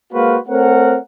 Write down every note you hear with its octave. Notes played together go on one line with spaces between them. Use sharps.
G#3 A#3 F#4 B4 C5 F5
A3 C4 A#4 C#5 F#5